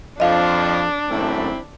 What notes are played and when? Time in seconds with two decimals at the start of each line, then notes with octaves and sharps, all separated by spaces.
0.20 F2 F3 D4 D#5 F5
1.10 G#1 F#2 A3 C4 E4